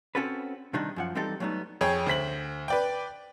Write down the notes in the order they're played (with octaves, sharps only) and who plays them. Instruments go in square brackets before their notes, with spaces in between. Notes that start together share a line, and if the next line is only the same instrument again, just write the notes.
[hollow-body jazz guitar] C4 C#4 F#4 A4 B4
C3 D#3 G3 D4 D#4
F#2 F3 F#5
E3 G3 C4 D#4 G4 A4
F#3 G3 A3 B3 D#4
[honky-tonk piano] F2 G#4 C#5 G5
D2 C5 B6 F#7
B4 D5 G5